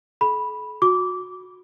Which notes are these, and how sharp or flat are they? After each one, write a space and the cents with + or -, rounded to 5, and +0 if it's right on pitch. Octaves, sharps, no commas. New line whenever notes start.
A4 -45 B5 -10
F#4 -25 D6 -20